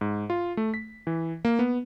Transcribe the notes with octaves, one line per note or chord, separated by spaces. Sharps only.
G#2
F4
A3
B6
E3
A#3
B3